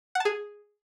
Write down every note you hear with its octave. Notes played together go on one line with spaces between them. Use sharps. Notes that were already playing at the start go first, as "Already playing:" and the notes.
F#5
A5
G#4